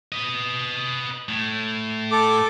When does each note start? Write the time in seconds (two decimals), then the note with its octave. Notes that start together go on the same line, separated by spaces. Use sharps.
0.12 B4 D#5
1.28 A2
2.12 A4 D6